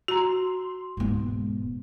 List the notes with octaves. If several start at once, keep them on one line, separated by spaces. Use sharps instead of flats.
F#4 A#5 C6
E1 G#2 B3